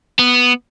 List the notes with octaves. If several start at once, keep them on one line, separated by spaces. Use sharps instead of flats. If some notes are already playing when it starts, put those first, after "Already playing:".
B3